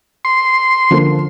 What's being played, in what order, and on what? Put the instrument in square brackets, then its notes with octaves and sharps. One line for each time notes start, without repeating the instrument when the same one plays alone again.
[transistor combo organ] C6
[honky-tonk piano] D3 F3 A#3